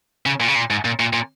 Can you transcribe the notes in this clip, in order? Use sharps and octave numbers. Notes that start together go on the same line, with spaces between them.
C#3
A#2
C#3
A#2
G#2
A#2
A#2
A#2